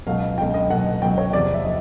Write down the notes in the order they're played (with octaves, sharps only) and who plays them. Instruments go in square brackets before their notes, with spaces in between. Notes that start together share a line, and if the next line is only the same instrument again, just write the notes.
[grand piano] C#2 B2 F#3 F5
C#2 B2 F#3 G5
D#5
C#2 B2 F#3 F#5
C#2 B2 F#3 G5
C#5
E2 C3 F3 D5
E5
F3 D#5